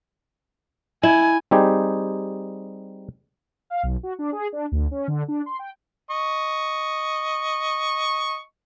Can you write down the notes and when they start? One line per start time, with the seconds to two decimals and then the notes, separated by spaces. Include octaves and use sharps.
1.03 E4 G#5
1.51 G3 C4 D#4 G4 G#4
3.70 F5
3.83 B1
4.03 F#4
4.19 D4
4.32 G#4
4.53 D4
4.72 D2
4.91 C#4
5.08 D3
5.28 D4
5.46 C6
5.59 G5
6.11 D#5 C#6